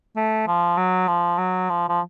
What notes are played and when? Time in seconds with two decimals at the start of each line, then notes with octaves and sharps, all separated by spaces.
0.16 A3
0.47 F3
0.77 F#3
1.08 F3
1.38 F#3
1.70 F3
1.89 F3